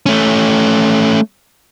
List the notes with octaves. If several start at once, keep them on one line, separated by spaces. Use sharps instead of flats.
A3 C#4